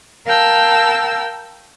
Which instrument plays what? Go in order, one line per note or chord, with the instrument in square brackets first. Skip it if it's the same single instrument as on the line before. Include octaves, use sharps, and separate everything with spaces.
[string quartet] A#4 F5 G5 A5 E6